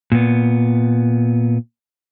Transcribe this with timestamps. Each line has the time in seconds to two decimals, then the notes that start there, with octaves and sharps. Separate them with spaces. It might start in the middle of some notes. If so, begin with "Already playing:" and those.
0.12 A#2 B3